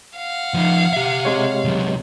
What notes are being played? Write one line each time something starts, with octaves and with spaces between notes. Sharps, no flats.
F5 F#5
F3 D#4
G4 E5
C3 G#3 C#5
C2 F#3